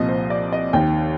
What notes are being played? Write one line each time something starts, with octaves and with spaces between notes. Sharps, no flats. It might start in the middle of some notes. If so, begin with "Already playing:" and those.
Already playing: C2 A#2 F3 D#5
C5
D5
D#5
D#2 D#3 G5